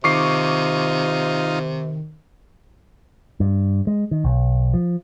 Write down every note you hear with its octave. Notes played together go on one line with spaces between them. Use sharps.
C3 D#3 D#4 F4 C#6 D6 C7
G2
G#3
D#3
B1
F3